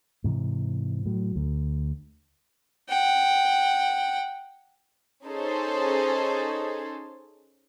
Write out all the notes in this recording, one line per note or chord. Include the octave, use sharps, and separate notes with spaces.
G#2 C3 E3
A2 F#3
D2
F#5 G5
C#4 D#4 G#4 A4 C5